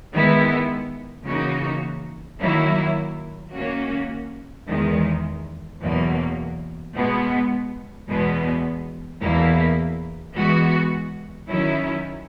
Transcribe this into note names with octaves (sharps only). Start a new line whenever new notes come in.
D#3 G#3 B3 E4
C#3 E3 A#3 D#4 F#4
D#3 F#3 A#3 E4
D#3 A#3 C#4 F#4
E2 D#3 G#3
E2 B2 F#3 A#3
B2 G#3 B3
E2 B2 G#3 B3
E2 B2 A#3 E4
E3 G#3 B3 F#4
D#3 F#3 C#4 E4